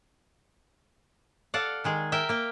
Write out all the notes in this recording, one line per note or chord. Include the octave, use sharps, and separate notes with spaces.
A4 D5 F5 F#5
D#3 G#3 G#4
A#4 E5 G5
A#3 G5